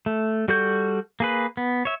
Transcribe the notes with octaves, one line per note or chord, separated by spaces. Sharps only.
A3
G3 F#4 A4 C#6 G6
A#3 G#4 B4
B3
C#5 E5